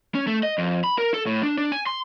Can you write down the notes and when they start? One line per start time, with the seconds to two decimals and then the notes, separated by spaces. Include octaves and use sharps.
0.15 C#4
0.27 A3
0.43 D#5
0.58 F2
0.84 B5
0.98 A#4
1.14 A4
1.26 A2
1.43 D4
1.58 D4
1.72 G#5
1.87 C6